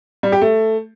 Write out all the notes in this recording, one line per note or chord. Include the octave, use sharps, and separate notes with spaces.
G3
G4
A3